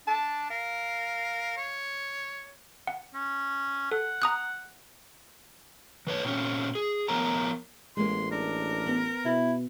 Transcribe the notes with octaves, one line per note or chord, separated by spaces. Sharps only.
D4 A5
A#4 F5
C#5
F#5
C#4
A4 F#5
A#5 D#6 F#6
E3 B4 C#5
A#2 C4 C#4
G#4
F3 B3 A#4 C#5 A#5
A1 G#3 A#3 C6
D4 A#4
B3
B2 E4